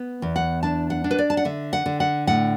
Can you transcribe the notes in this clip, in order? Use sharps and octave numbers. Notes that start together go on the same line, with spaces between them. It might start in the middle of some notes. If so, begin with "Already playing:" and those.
Already playing: B3
E2
F#5
D4 A5
F#5
D4
B4
D5
A5
F#5
D3 E5
F#5
D3
F#5
A2 F#5